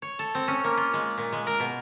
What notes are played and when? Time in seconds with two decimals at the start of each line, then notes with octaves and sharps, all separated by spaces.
0.02 C#5
0.19 A4
0.35 C4
0.48 C#4
0.64 A#3
0.78 F4
0.94 G#3
1.18 A#2
1.32 G#3
1.47 A#4
1.60 B2